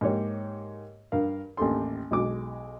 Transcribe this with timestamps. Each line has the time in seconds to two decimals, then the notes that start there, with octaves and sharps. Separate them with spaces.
0.01 G#2 A#3 G4 C#5
1.12 G2 A#4 F5
1.57 A1 D#2 G4 A4 C6
2.11 B1 G#3 F#4 D6